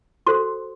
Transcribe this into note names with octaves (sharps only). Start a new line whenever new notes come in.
F#4 A4 C5 C6